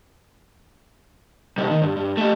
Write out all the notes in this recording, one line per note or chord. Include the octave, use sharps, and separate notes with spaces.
B1 G3
D#3
G2
G2
A3 G4